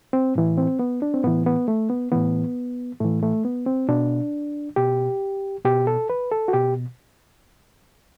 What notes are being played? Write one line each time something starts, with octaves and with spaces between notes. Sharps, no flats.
C4
A2 E3
C4
B3
D4
C4
A2 E3 B3
B3
A3
B3
A2 E3 B3
A2 E3 A3
A3
B3
C4
B2 D4
B2 G4
B2 G4
A4
B4
A4
F#4
B2 G4